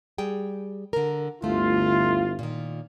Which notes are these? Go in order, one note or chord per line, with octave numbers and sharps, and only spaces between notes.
G3 G#4 G5
D3 A#4
G1 D2 A3 E4 F4
A#2 D#3